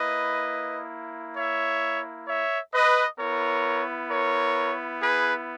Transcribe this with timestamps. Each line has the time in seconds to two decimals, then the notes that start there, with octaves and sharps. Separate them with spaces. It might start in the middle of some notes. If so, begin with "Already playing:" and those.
Already playing: A#3 E4 B4 D#5
1.37 C#5 E5
2.28 C#5 E5
2.74 B4 D#5
3.19 B3 E4 A#4 C#5
4.10 A#4 C#5
5.01 G#4 B4